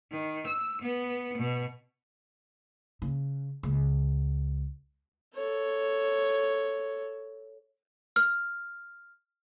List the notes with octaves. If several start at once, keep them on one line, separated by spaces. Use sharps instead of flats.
D#3
E6
B3
B2
C#3
C#2
A4 C#5
F6